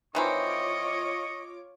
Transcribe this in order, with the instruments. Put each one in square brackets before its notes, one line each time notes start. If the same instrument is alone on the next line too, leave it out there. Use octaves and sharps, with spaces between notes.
[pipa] D#3 E3 C4 [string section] F4 C#5 D6 [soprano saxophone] D#5 [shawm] C#6